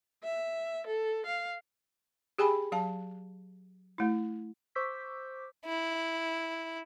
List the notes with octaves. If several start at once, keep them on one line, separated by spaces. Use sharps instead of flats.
E5
A4
F5
G4 G#4 G5 G#5 B5
F#3 F5 A5
A3 E4
C5 C#6 D6 E6 G6 B6
E4